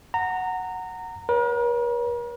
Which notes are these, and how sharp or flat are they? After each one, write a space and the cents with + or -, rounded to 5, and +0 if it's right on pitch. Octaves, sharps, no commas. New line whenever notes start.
F#5 +0 A#5 -20
A#4 +45 C#5 +0